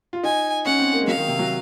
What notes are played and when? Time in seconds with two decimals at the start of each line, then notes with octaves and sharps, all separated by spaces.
0.13 F4
0.23 D#4 G#5
0.65 C#4 F#5
0.80 C4
0.93 A#3
1.01 G#3
1.07 F#3 F5
1.17 D#3
1.28 C3
1.39 F#3